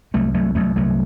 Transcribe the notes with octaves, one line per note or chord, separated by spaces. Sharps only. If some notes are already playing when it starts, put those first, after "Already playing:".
C2 F#3 A3
C2 F#3 A3
C2 F#3 A3
C2 F#3 A3